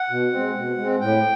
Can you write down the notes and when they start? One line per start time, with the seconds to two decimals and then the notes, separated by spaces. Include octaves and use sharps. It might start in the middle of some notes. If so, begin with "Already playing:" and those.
Already playing: F#5
0.10 B2
0.32 G#3 C4
0.55 B2
0.78 G#3 C4
1.00 A2 G5